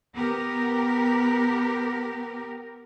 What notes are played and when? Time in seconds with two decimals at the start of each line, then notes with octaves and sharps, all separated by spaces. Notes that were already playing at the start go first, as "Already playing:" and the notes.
0.14 B3 G4 A#4